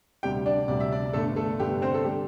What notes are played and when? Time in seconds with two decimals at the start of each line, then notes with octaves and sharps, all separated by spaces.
0.23 D2 C3 G3 G4 G5
0.46 D4 D5
0.68 D2 C3 G3 D5
0.80 E5
0.92 D4 D5
1.13 G1 G2 D3 A3 A4
1.36 A3 A4
1.60 G1 G2 D3 G4
1.82 C4 C5
1.94 A4
2.04 D3 G3 G4